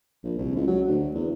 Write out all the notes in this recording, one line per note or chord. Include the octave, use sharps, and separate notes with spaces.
A#1
C2
C#2
F#3
D2
E2